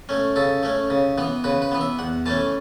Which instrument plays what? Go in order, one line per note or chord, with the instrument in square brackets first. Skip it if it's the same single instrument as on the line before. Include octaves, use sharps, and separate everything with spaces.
[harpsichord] A3 C#4
C#3 A4
A3 C#4
C#3
E3 B3
C#3 B4
B4
E3 B3
E5
E2 F#5
E3 A3 C#4 A5